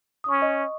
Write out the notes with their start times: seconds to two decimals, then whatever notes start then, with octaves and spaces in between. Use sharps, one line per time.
0.24 D#6
0.29 C#4 C#6
0.42 D#5